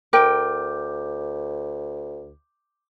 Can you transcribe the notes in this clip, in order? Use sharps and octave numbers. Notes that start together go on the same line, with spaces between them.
D2 A#4 G5 D6 G6